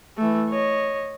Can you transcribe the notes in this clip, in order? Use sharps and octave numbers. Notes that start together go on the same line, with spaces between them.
E3 A3
C#5 D#5